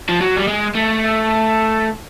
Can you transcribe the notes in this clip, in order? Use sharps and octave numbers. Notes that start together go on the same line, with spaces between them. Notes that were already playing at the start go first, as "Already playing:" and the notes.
F3
F#3
G3
G#3
A3